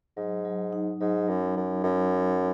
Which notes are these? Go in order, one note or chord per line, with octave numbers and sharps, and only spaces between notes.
G#2 F#3
F#3
D#4
G#2 F#3
F#2 F#3
F#2 D#4
F#2 F#3
F#3